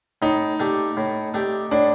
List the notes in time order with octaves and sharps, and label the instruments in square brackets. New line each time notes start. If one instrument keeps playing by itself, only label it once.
[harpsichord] A2 [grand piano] D#4
[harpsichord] A3 D4 G4
A2
A3 D4 G4
[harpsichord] A2 [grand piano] D4